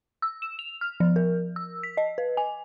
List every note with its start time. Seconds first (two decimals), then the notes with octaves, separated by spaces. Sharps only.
0.22 E6
0.42 E7
0.59 F7
0.81 F6
1.00 F3
1.16 A#4
1.56 E6
1.83 B6
1.97 D#5
2.18 B4
2.37 G#5